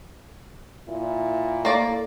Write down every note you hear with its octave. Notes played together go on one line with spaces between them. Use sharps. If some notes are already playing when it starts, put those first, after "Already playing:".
A#2 E4
A#3 A4 D5